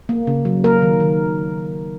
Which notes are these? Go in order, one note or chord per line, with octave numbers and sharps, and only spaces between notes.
A#3
C#3
F#3
A#3 A#4
D#3
D#3